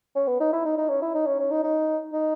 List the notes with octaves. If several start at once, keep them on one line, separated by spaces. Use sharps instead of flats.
C#4
B3
D#4
E4
D#4
D#4
C#4
E4
D#4
C#4
C#4
D#4
D#4
D#4